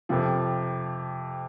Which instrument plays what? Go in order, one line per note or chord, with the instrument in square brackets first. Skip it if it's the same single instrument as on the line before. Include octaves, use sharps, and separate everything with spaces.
[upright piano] F2 C3 F3